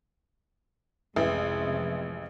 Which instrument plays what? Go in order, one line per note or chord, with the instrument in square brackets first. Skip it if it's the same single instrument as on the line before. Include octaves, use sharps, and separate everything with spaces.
[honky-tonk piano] A1 [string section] F2 C3 [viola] G#3 [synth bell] B4 E5